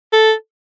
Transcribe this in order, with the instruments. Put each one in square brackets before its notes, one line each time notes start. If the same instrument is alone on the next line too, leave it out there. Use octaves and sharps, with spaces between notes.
[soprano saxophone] A4